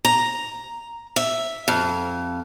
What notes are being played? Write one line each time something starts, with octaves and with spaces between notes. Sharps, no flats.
A#5
E5
F2